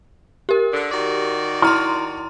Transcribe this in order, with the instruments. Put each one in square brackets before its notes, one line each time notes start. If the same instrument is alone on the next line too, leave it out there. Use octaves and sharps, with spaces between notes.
[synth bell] G4 A#4
[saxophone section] D3
D#3 F#4 D5
[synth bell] E4 A#5 C6 [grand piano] C#6 F6